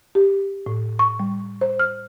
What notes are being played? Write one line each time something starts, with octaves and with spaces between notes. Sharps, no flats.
G4
A2
C#6
G3
C5
F6